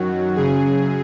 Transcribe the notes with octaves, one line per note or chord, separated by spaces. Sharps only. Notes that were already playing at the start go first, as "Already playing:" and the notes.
Already playing: F#2 D#3 F#3 F#4
F#2 C#3 F#3 G#4